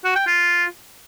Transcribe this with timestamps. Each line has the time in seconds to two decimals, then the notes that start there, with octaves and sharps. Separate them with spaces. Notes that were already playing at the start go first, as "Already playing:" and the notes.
0.04 F#4
0.16 G5
0.27 F4